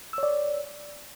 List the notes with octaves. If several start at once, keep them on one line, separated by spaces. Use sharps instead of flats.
C#5 D5 E6